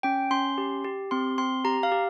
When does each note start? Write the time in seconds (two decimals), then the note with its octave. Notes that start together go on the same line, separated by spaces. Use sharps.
0.03 C#4 G5
0.31 C#4 C6
0.58 G4
0.84 G4
1.11 C4 C6
1.38 C4 C6
1.65 G4 A#5
1.83 F5
1.92 G4